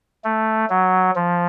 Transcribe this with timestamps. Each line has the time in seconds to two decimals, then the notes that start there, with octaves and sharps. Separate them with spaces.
0.24 A3
0.70 F#3
1.16 F3